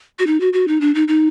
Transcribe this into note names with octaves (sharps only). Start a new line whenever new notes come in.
F#4
D#4
F#4
F#4
D#4
D4
D#4
D#4